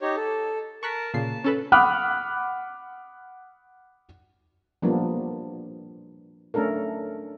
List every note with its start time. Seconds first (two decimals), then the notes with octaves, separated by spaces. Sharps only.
0.01 D#4 G4 C#5
0.16 A4
0.83 A#4 A5 C#6 F#6 B6
1.14 A#2 C#3 A5 C7
1.44 C#4 A4 B4
1.72 F#5 B5 D6 D#6 F6 F#6
4.82 F3 G3 A#3 B3 D4
6.54 A3 C#4 D4 A4 A#4